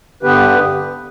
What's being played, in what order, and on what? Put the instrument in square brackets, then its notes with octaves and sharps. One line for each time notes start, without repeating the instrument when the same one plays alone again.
[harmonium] G2 D3 B3 G4 B4